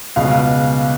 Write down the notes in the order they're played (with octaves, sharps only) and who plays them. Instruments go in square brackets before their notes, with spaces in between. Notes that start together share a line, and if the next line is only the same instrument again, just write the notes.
[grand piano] C#2 B2 F5